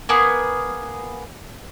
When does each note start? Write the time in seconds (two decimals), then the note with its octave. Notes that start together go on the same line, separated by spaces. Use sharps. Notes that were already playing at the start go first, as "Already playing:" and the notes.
0.09 A#3 B3 G#4